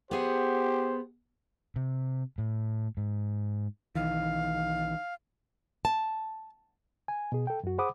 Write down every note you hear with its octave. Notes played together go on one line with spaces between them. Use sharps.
B3 G4 G#4 C5 F#5
C3
A2
G#2
B1 D#3 E3 F5
A5
G#5
B2 G#4
A4 G5
F#2 F#4
G#4 C5 F#5 B5 D6 D#6